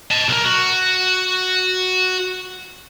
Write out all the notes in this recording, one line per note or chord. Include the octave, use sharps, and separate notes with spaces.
D#5 A5
B1 A#4
F#4